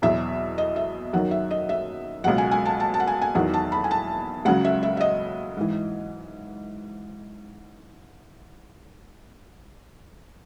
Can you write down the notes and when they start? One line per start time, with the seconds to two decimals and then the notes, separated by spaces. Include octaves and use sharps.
0.02 E2 B2 F#3 E5
0.58 D#5
0.76 E5
1.13 F#2 D#3 F#3 F#5
1.31 E5
1.51 D#5
1.69 E5
2.24 C#2 B2 F#3 F#5
2.38 G#5
2.51 G#5
2.66 A5
2.80 A5
2.94 A5
3.00 F#5
3.07 G#5
3.22 G#5
3.35 E2 D#3 F#3 F#5
3.54 A5
3.72 B5
3.84 G#5
3.91 A5
4.45 C#2 C#3 F#3 F#5
4.65 E5
4.83 E5
4.97 E5
5.01 D#5
5.57 G#2 E3